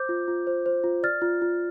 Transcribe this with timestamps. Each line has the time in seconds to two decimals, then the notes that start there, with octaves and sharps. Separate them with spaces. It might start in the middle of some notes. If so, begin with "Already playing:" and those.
Already playing: C5 D6 G6
0.09 F4
0.28 F4
0.47 C5
0.66 C5
0.84 F4
1.03 D5 F6 A6
1.22 F4
1.42 F4